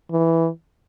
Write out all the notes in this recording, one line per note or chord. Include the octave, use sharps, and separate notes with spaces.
E3